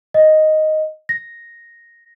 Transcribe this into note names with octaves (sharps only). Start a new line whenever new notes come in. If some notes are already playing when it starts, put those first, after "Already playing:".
D#5
A#6